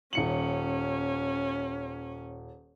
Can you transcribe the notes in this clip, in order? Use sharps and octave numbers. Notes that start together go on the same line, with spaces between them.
D#1 C#4 C#7 F#7